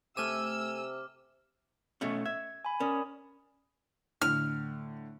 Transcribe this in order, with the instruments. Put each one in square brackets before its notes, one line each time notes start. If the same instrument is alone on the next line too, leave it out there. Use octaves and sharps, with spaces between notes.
[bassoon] C3 [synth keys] A3 G#5 D#7 [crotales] D6 F6 [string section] E6
[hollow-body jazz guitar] B2 A3 C#4
[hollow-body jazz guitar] E5 [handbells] G#6
[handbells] G#5 B5
[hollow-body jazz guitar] C#4 [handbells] A#4 D5 D#6
[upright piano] A2 D3 [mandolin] F6